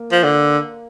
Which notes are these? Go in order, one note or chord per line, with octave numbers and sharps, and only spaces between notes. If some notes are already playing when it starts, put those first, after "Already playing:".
Already playing: A#3
F3
D3